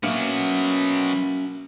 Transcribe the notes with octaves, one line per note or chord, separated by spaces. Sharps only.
F#3 A#3 B3 C#4 E5